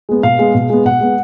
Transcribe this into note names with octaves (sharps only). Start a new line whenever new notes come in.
G#3 B3
B2 F5
G#3 B3
B2
G#3 B3
B2 F#5
G#3 B3